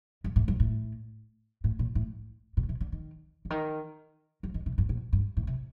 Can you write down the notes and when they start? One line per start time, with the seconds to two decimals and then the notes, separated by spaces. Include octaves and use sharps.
0.24 G2
0.36 A2
0.48 G2
0.60 A2
1.64 A2
1.79 A#2
1.95 A2
2.57 A#2
2.69 C3
2.81 D3
2.92 D#3
3.45 D3
3.50 D#3
4.43 F#3
4.54 D#3
4.66 C3
4.78 G2
4.89 A#2
5.13 G2
5.37 A2
5.47 C3